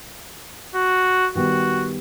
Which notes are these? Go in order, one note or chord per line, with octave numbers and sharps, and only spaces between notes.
F#4
D#3 G3 B3 F#4